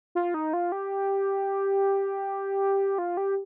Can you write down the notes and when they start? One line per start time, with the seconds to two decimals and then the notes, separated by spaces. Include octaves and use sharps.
0.15 F4
0.34 D#4
0.53 F4
0.72 G4
2.98 F4
3.17 G4